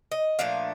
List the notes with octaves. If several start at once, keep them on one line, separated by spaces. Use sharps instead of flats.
D#5
A#2 F3 A3 D4 F5